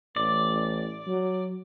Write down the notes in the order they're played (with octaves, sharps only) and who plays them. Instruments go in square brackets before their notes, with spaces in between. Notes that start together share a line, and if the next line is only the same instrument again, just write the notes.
[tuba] A1 [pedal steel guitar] D5
[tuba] F#3